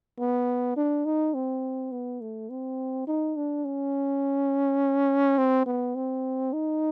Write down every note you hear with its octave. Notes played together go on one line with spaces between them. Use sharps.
B3
D4
D#4
C4
B3
A3
C4
D#4
D4
C#4
C4
B3
C4
D#4